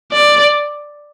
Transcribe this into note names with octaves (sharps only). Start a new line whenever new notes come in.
D5